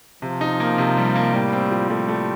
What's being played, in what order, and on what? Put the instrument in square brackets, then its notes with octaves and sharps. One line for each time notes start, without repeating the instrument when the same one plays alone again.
[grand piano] C3 [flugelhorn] F3
[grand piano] D#4
A#3
C3
G3
A#3
[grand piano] A2 [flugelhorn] G3
[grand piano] C4
F3
[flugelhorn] G3 [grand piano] A3
[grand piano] A3